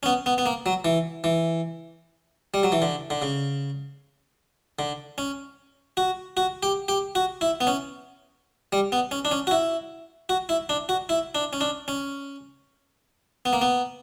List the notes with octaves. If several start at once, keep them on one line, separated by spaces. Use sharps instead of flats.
C#4
B3
B3
B3
A#3
F#3
E3
E3
G3
F#3
E3
D3
D3
C#3
D3
C#4
F#4
F#4
G4
G4
F#4
E4
B3
C#4
G3
B3
C#4
D4
C#4
F#4
E4
F#4
E4
D4
F#4
E4
D4
C#4
D4
C#4
B3
A#3
B3